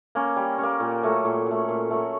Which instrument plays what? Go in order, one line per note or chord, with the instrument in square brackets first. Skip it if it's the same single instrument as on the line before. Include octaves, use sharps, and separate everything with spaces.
[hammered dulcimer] A#3 C#4
G3
C#4
A#3
A#2
F#3 A3
A#2
F#3 A3
A#2
F#3 A3